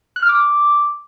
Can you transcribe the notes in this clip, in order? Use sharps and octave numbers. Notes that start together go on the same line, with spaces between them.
F#6
F6
D6